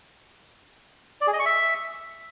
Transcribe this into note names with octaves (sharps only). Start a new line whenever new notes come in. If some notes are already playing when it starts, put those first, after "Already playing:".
D5
G#4
D#5
C#6
E5